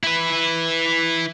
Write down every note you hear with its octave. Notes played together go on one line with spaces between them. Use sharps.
E4 B4